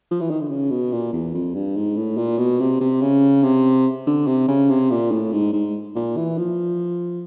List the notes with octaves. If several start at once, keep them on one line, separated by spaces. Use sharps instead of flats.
F3
E3
D#3
D3
C#3
B2
A#2
E2
F2
G2
G#2
A2
A#2
B2
C3
C3
C#3
C3
D3
C3
C#3
C3
A#2
A2
G#2
G#2
A#2
E3
F3